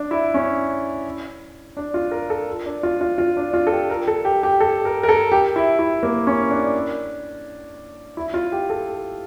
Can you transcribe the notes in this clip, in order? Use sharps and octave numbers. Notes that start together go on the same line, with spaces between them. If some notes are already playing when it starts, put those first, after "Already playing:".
Already playing: D4
E4
C#4
D4
F4
A#4
A4
D4
F4
F4
F4
D4
F4
A4
G4
A#4
A4
G4
G4
A4
A#4
A#4
A4
G4
E4
E4
A#3
C#4
D4
E4
F4
G4
A4